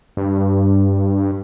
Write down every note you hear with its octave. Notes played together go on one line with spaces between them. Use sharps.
G2